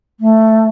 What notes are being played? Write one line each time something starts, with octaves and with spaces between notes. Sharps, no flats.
A3